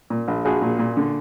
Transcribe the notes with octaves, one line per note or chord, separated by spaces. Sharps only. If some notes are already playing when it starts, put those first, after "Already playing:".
A#2
A#1
A#1 F#4 G#4
A#2
A#2
D3